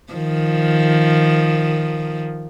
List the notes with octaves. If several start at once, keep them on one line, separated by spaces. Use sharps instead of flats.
D#3 F3